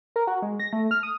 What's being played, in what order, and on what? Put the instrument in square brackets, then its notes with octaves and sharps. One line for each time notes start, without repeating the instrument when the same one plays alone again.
[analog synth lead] A#4
F#4
G#3
A#6
A3
F6
D#6